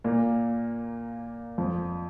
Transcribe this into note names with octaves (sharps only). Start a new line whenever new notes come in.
A#2 A#3
F2 F3